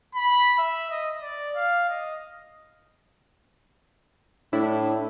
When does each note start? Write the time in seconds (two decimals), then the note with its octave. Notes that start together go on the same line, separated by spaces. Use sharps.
0.15 B5
0.58 E5
0.91 D#5
1.21 D5
1.56 F5
1.90 D#5
4.53 A2 D4 E4